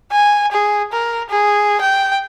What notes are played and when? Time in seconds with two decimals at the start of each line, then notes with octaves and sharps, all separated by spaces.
0.12 G#5
0.52 G#4
0.92 A#4
1.30 G#4
1.81 G5